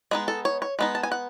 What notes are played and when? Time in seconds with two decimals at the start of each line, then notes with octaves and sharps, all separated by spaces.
0.11 G#3 B3 D#4 G#4
0.28 A4
0.45 C#5
0.62 C#5
0.79 G#3 B3 D#4
0.95 A5
1.03 G#5
1.12 F#5